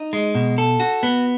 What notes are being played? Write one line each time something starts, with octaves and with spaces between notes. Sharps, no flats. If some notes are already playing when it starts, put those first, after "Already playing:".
Already playing: D#4
G#3
B2
A4
F#4
B3